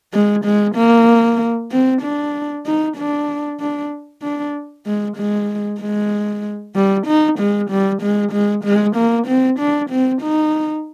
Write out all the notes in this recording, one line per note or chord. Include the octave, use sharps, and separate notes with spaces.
G#3
G#3
A#3
C4
D4
D#4
D4
D4
D4
G#3
G#3
G#3
G3
D#4
G#3
G3
G#3
G#3
G#3
A#3
C4
D4
C4
D#4